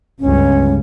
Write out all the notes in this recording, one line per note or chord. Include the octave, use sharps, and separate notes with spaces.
G1 C#2 C#4